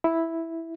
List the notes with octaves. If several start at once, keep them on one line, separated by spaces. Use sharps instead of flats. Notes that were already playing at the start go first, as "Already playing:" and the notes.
E4